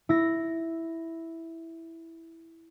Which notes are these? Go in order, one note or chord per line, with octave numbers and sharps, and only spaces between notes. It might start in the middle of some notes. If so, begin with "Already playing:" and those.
E4 A#6